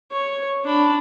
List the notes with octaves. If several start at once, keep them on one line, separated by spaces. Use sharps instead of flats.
C#5
D4 B5